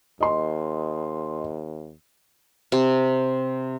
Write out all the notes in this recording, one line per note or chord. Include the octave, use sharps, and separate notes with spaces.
D#2 D#5 C6
C3